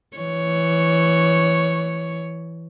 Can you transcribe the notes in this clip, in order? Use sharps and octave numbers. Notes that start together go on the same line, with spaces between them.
E3 C#5